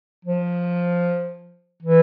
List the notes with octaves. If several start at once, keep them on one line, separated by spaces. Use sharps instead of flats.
F3
E3